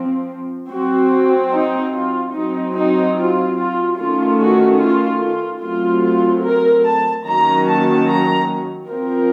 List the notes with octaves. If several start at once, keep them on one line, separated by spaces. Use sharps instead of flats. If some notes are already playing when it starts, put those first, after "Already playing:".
Already playing: F3 C4
F#3 C4 F#4
D#4
F4
F#3 C4 D#4
D#4
F4
F4
D#3 A3 C#4 F4
F#4
F4
F4
F#3 A3 C4 F4
F4
A#4
A5
D#3 F#3 A#3 C#4 A#5
A5
A#5
F3 C4 A#4